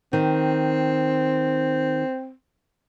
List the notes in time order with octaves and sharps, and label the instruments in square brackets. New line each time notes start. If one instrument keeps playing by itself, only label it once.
[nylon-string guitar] D#3 [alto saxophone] C4